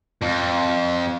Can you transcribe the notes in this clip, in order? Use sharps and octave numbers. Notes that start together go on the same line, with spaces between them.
F2